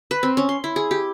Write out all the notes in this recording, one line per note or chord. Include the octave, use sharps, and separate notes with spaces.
B4
C4
C#4
C6
E4
G#4
G4